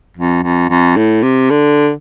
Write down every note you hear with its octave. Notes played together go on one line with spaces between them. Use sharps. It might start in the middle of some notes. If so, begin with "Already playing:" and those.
F2
F2
F2
A2
C3
D3